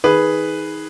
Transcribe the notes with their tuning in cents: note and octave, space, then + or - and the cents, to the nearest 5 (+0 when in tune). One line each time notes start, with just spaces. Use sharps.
D#3 +30 G#4 +0 B4 +0